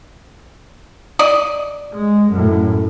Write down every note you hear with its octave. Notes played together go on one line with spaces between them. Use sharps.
D5 D#5
G#3
F#2 A2